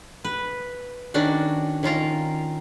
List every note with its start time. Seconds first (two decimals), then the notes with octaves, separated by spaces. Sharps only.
0.24 B4
1.14 D#3 C#4 D4 F#4
1.83 D#3 C#4 F4 A#4